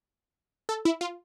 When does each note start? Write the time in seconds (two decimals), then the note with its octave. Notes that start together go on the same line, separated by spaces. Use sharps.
0.69 A4
0.85 E4
1.01 F4